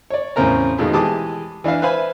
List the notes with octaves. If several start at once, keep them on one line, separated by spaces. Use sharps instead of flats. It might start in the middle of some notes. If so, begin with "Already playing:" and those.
C#5 D5
E2 A2 C#3 C4 A#4 A#5
F2 B2 D#3 G#3 A3
E3 G#3 G4 A5 D6 D#6
E3 D4 E5 F5
B4 C5 E5 F5 G#5 B5